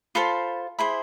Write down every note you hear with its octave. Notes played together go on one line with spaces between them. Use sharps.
F4 A4 C5 B5
E4 G#4 C5 B5